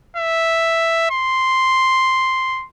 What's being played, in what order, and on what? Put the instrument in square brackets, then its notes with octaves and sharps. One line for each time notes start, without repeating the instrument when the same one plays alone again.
[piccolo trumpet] E5
C6